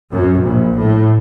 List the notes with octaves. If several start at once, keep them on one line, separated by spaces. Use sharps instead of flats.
F#2
A#1
A2